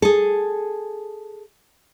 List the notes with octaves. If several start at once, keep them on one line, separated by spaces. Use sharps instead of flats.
G#4 A4